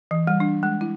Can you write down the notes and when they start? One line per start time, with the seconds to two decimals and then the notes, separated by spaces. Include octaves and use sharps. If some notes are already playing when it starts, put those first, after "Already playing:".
0.11 E3
0.27 G3
0.40 D4
0.63 G#3
0.81 E4